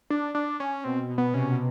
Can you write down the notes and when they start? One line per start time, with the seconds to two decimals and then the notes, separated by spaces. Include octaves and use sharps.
0.10 D4
0.35 D4
0.60 C#4
0.84 B2 C4
1.09 B2
1.18 B3
1.33 C3 C#4
1.50 B2